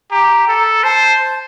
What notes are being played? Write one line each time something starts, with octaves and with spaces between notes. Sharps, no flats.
G4 A#5
A4
C5 A5